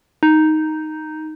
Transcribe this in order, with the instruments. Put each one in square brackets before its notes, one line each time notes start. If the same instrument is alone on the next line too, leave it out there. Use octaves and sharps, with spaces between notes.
[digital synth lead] D#4